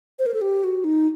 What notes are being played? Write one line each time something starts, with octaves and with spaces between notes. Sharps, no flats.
C5
A#4
A4
G4
F#4
D#4